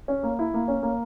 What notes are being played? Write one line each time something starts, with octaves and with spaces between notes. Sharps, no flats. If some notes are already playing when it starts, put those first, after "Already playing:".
C#4
A#3
E4
A#3
C#4
A#3